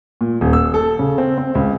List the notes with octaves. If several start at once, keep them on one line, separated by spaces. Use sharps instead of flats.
A#2
D#1
E6
A4
C#3
C4
C4
C#2